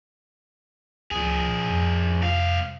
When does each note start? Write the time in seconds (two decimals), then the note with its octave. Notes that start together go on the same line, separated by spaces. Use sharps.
1.11 C#2 F3 G#4
1.48 A#2
1.70 F2
2.22 C2 F5